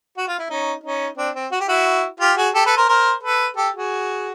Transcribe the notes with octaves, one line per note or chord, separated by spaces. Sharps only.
F#4
F4
E4
C#4 D#4
C#4 D#4
C4 D4
C4
F#4
G4
E4 F#4
F4 G4
F#4 G#4
G4 A4
A4 B4
A#4 C5
A#4 C5
A4 B4
G4 A4
F#4 G#4